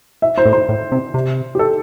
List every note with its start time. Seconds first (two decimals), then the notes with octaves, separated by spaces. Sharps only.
0.22 E5
0.38 C5
0.45 A2
0.53 C5
0.69 A2
0.92 C3
1.14 C3
1.55 G4
1.59 A4